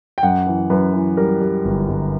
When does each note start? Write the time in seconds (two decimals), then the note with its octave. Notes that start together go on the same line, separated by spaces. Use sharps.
0.18 G5
0.23 F#2 F#5
0.47 E3
0.70 F#2 B4
0.94 E3
1.17 G3 A#4
1.41 G3
1.65 G1
1.89 G1